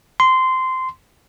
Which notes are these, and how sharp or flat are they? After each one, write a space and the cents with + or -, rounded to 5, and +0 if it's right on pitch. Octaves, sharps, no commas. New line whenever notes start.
C6 -15